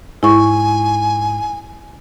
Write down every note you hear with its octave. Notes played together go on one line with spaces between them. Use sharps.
G#2 E4 G#5 C#6